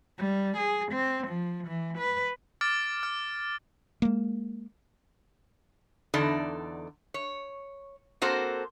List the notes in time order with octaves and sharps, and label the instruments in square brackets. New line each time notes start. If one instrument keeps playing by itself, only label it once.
[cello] G3
G#4
C4
F3
E3
B4
[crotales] D6 F6 A6 D7
F6
[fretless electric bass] G#3 A#3
[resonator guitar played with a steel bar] E2 D3 D#4 A4 D5
C#5
A#3 C4 F#4 A4 C5